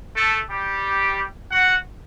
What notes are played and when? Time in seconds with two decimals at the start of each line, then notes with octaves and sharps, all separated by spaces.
0.15 A3 A4
0.50 G3 G4
1.51 F#4 F#5